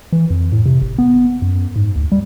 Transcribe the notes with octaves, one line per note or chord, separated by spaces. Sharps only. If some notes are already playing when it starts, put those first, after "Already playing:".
E3
F2
A2
C3
G1
B3
F#2
G#2
D2
G3